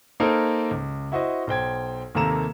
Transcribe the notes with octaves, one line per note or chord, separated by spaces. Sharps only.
A#3 D#4 A4 A#4 C5
C#2
E4 F#4 C5 D#5
B1 C5 G5 G#6
D#2 C3 A#3 A4 A#5 E7